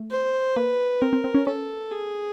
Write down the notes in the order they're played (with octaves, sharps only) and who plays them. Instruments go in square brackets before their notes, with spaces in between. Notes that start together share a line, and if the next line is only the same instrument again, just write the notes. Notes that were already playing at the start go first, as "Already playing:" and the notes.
Already playing: [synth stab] A3
[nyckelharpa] C5
[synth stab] A#3 [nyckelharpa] B4
[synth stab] C4 [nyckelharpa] A#4
[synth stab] C4
C4
C#4
[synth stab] C#4 [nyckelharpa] A4
[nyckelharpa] G#4